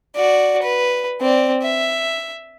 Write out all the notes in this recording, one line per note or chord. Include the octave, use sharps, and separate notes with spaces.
F#4 D5
B4
C4 D5
E5